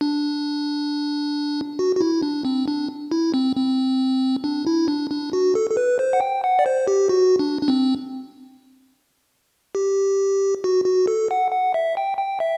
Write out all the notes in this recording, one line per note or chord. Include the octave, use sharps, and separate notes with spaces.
D4
F#4
F#4
E4
D4
C4
D4
E4
C4
C4
D4
E4
D4
D4
F#4
A4
A4
B4
C5
F#5
G5
F#5
D5
C5
G4
F#4
D4
D4
C4
G4
F#4
F#4
A4
F#5
F#5
E5
G5
G5
E5